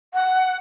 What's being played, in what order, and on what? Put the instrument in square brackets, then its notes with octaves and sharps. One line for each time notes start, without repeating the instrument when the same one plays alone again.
[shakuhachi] F#5